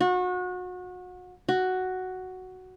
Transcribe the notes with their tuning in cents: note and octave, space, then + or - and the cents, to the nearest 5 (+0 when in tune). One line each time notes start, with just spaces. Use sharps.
F#4 -30
F#4 +5